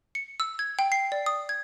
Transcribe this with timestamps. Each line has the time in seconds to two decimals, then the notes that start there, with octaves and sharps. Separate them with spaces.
0.15 C#7
0.40 E6
0.59 G#6
0.79 G5
0.92 C7
1.12 D5
1.26 D#6
1.49 G#6